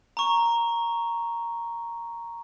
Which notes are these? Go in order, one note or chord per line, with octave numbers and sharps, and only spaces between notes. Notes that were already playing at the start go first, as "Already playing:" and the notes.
A#5 C#6